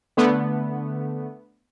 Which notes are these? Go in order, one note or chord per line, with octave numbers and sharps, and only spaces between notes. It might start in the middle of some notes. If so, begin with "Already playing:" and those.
D3 A3 B3